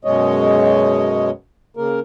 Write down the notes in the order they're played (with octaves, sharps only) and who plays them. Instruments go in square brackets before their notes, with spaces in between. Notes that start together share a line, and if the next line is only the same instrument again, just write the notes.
[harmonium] F#2 B2 G#3 C#5 D#5
C#3 A#3 A#4